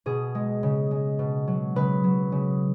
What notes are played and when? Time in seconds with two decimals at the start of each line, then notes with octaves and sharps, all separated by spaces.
0.06 B2 G#4
0.35 G#3
0.63 C#3
0.91 G#3
1.19 B2
1.47 F#3
1.76 C#3 B4
2.04 F#3
2.32 C#3